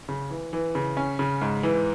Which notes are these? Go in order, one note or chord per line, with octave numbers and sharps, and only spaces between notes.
C#3
E3
E3
C#3
C#4
C#3
G#2
E3